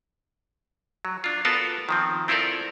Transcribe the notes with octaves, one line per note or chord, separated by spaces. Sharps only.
F#3
D4 F4
B3 F4 F#4 A4 A#4 A5
D#3 F3 C4
C4 E4 F4 A4 A#4 D5